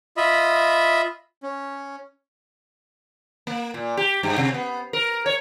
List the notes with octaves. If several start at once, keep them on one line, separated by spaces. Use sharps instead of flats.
F4 D#5 E5 B5
C#4
A#3
A#2
G4
G2
C3
B3
A#4
C#5